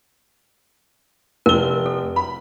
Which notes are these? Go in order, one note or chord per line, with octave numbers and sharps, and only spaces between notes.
F1 A#4 G7
A4
B5